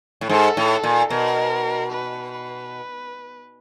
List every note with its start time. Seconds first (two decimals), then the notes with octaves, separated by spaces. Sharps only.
0.21 A2
0.29 G#2 A4
0.57 A2
0.83 A#2
1.10 B2 A#4
1.91 B4
2.32 B4